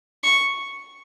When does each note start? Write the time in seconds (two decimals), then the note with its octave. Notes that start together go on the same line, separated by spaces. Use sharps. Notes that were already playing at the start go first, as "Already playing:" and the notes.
0.24 C#6